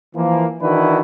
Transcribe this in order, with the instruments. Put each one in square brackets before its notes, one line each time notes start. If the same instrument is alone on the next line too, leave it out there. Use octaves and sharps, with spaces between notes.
[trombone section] E3 F3 A#3
D#3 E3 D4 E4 F#4 B4